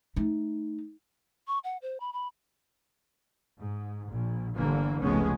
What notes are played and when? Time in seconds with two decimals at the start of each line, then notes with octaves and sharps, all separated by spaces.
0.16 A3 D#4
1.48 C#6
1.64 F#5
1.82 C5
2.00 B5
2.13 B5
3.58 G#2
4.10 A#1
4.55 G1 D3 E3 A#3
5.02 F1 C#2 G#3 A3 B3 C#4